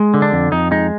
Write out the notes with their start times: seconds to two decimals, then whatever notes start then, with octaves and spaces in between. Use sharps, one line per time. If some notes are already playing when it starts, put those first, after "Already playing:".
Already playing: G#3
0.14 D3
0.22 D4
0.33 F2
0.52 F2 D#4
0.71 G#3 D#4